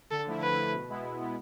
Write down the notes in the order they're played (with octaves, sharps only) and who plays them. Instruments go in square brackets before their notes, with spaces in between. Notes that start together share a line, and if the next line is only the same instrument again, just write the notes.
[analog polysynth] D3 [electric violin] A4
[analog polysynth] F3 A3 E4
[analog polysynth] D3 [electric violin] B4
[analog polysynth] F3 A3 E4
B2
G#3 B3 E4
B2
G#3 B3 E4